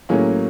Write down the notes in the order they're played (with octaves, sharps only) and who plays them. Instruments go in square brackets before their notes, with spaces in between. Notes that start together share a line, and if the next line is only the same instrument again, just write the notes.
[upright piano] A2 F#3 A#3 C#4 G#4